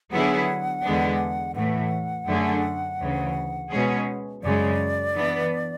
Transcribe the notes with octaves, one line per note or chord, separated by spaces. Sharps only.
D3 F#3 B3 E4 G#4 F#5
E2 D3 G#3 B3 D4
A2 E3 A3 F#5
F#2 D3 A3 D4 G#4
D2 C#3 E3
B2 G#3 C#4 G#4
F#2 C#3 G#3 D5
E3 B3 D4